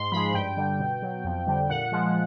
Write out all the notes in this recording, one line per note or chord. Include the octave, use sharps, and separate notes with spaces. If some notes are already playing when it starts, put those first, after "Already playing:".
Already playing: G#2 C6
F3 G#3 B5
G2 G5
D3 G3
B2
F#3
F2
D3 G3
A#2 F#5
F3 G#3